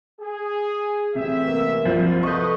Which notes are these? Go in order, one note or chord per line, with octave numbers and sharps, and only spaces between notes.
G#4
A1 C3 E5
A#3
C2 F3
A4 B4 D#5 C#6 D#6 G6